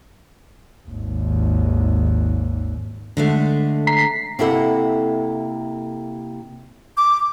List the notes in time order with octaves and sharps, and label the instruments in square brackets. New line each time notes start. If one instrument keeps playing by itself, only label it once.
[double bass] G#1 D#2
[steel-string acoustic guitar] D3 G#3 A3
[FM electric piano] A#5 B6 C7
[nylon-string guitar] C3 A#3 E4 A4 F#5
[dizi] D6